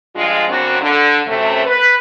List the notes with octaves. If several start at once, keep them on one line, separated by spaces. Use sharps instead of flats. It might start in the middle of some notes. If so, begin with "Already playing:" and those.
G2 F3 G#3 F4
F#2 C#3 A#3 C4 D4 F#4
D3
F#2 C3 A3
B4